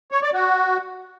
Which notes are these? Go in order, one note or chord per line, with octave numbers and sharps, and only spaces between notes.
C#5
D5
F#4